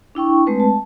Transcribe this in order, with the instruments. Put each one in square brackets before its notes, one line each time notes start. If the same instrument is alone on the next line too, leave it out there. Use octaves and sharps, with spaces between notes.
[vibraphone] D4 E4 G5 C#6
G#3 A3 C4 B4 A5
A5